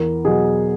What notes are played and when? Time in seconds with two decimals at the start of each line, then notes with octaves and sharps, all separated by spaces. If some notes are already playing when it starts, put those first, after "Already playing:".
Already playing: E2 A#4
0.25 B2 F#3 G#4